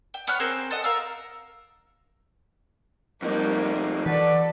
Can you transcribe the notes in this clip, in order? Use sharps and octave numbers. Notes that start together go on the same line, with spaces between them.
G5
B3 C#5 F6 F#6
C4 G#4 A#4 C5
A4 D#5 F#5
A#4 F5 E6
F2 G3 A#3 D#4
E3 F#4 A4 B4 D5